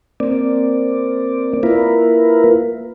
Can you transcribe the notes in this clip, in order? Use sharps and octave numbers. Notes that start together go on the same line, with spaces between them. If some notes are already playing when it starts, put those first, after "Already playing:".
A#3 C4 D5
A#3 E4 F4 A#4 B4